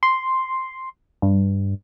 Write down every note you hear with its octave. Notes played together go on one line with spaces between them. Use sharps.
C6
G2